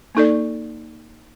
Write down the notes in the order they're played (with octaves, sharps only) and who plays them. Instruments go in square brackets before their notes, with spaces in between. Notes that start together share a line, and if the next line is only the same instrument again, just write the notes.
[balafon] A#3 D#4 A4 D5